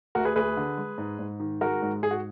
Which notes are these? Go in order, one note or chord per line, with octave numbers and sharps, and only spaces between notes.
D2 F#4 A#4
G#4 B4
D2 G#4 B4
D3
G#3
G#2
G#2
D#3
G#3 F#4 A#4
G#2
G#2 G#4
F#4